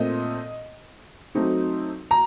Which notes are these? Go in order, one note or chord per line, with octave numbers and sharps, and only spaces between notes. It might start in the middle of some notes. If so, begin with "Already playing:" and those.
Already playing: A#2 A3 C4 D#5
F#3 A3 C4 D#4
A#5